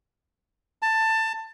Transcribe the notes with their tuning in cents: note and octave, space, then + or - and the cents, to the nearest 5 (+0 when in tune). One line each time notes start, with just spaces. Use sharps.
A5 +15